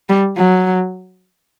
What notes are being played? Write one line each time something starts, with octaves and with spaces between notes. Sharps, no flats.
G3
F#3